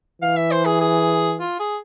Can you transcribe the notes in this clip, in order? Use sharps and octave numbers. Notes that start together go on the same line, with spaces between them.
E3 F5
E5
C5
G#4
G#4
F4
G#4